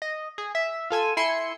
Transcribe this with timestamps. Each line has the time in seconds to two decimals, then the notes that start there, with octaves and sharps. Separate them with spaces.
0.02 D#5
0.38 G#4
0.55 E5
0.90 F4 A4 G#5 E6
1.17 E4 G#5 C6 E6 C#7